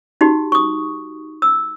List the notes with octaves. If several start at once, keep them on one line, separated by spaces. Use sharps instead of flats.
D#4 F#4 G4
C#6 D#6
E6